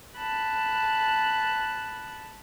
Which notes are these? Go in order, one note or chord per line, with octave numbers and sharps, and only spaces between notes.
A5 B5 F#6